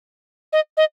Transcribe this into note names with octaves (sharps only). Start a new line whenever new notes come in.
D#5
D#5